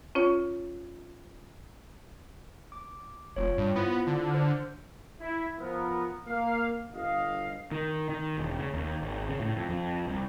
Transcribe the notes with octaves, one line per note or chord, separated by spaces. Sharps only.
C#4 F4 C#5
D6
F1 F4 C#5
G2
B3 E4 F4 C5
D3
C5 F6
E4
F3 B3 A#4
A#3 F5
G1 D#5 F5
D#3
D#3
E1
C#3
D#2
G#1
C#3
A2
F2
F2
C2